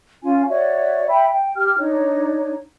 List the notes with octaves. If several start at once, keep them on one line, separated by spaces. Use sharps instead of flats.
C#4 F4 G#5
F#4 C#5 D5 E5
E5 G5 B5
G5
G4 F6
D4 D#4 C#5